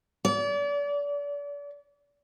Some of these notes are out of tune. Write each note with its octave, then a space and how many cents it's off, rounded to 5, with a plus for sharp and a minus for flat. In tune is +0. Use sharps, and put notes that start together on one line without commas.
D5 -35